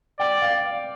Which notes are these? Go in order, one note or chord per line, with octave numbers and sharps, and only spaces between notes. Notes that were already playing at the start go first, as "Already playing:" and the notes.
D5 G5
F5